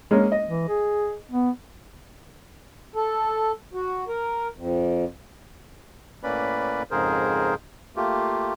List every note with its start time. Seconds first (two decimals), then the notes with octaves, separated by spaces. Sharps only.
0.11 G#3 A#3 C#4
0.32 D#5
0.48 E3
0.68 G#4
1.32 B3
2.96 A4
3.74 F#4
4.08 A#4
4.55 F2
6.24 A2 A#3 C#4 B4 D5 B5
6.91 F2 G#2 C#3 G#4 A#4 C5
7.96 A3 A#3 F4 G4